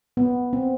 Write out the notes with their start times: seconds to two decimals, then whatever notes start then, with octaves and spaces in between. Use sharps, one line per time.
0.17 B3
0.53 C4